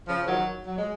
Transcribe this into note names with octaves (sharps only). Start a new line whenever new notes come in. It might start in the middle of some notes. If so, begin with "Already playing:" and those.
C#3 F3
D#3 F#3
F#3
G#3